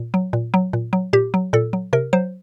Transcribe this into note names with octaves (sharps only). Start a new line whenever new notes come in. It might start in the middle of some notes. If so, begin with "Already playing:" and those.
Already playing: A#2
F#3
A#2
F#3
A#2
F#3
A#2 G4
F#3
A#2 A4
F#3
C3 A#4
F#3 C5